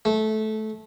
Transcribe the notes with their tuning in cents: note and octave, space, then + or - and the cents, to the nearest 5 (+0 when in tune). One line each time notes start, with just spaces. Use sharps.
A3 -20